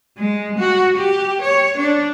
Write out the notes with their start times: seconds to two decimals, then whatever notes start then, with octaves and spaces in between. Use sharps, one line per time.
0.18 G#3
0.59 F#4
0.97 G4
1.42 C#5
1.78 D4